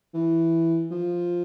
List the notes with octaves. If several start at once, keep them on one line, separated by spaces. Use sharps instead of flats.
E3
F3